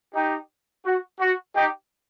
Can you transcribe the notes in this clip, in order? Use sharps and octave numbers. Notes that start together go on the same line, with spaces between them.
D#4 G4
F#4
F#4
D#4 G4